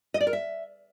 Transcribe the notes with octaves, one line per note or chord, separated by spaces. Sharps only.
D#5
D5
A#4
E5